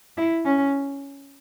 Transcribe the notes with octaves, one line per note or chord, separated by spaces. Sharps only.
E4
C#4